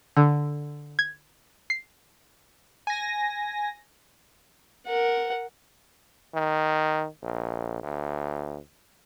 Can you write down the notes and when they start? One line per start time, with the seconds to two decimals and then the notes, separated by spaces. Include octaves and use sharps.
0.17 D3
0.99 G#6
1.70 C7
2.87 G#5 A#6
4.87 A#4 F#5
6.35 D#3
7.23 A#1
7.83 D2